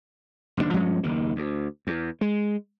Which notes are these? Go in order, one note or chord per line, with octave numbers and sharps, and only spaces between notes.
F#1 D#2 A2 D4
G2 F3 G#3 C#4
F#1 D#2 D#3
D2
E2
G#3